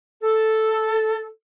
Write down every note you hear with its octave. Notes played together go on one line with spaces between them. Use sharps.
A4